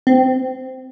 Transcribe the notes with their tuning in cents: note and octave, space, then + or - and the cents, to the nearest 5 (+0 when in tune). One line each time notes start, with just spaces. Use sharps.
C4 -15